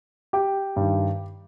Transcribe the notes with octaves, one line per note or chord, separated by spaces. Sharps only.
G4 G5
G2 D#3